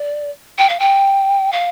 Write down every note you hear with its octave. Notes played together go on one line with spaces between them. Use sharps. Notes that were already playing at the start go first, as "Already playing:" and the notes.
Already playing: D5
G5
F5
G5
F5